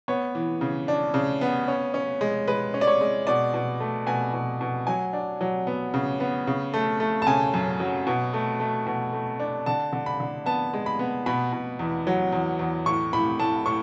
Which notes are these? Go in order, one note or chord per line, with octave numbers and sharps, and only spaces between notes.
B3 C#5
E3
C#3
D4
C#3
B3
C#4
C#4
G#3
G#3 B4
C#4
D5
C#5
G#3
B2 D5
B2
A3
B2 G#5
B2
B2
F#3 G#5
D4
F#3
B3
C#3
B3
C#3
A3
A3
A5
C#3 G#5
F#2
F#3
B2
A3
A3
B2
A3
D4
D3 A5
D3
B5
D3
B3 A5
G#3
B5
B3
B2 B5
B2
E2
F#3
E2
E2
A2 C#6
A2 B5
A2 A5
A2 C#6